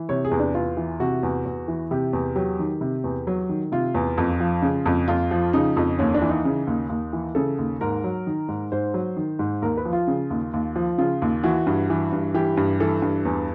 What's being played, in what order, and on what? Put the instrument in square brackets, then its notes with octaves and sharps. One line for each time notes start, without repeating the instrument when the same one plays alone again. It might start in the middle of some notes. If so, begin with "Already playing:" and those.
Already playing: [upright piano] E3
C3 C#5
G#4
E2
D4
E2 F4
E3
C3 F#4
E2
E2
E3
C3 G4
E2
F#3 G4
D#3
C3
E2
F#3
D#3
C3 F4
E2
F2
F3
C#3
F2
F2 F4
F3
C#3 D#4
F2
D#2 C#4
D4
E3
D#4
C#3
D#2
D#2
E3
C#3 A4
D#2
G#2 A#4
F#3
D#3
G#2
G#2 C5
F#3
D#3
G#2
D#2 A#4
B4
F3
F4
C#3
D#2
D#2
F3
C#3 F4
D#2
E3 F#4
G2
E3
G2
E3 G4
G2
E3 A4
G2
E2